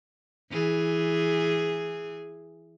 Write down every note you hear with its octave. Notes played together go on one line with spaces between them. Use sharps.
E3 G#4